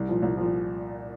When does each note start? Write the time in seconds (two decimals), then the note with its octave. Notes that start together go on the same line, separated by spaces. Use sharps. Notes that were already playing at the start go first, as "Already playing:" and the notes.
Already playing: C2
0.08 A#2 F3
0.23 C2
0.37 A#2 F3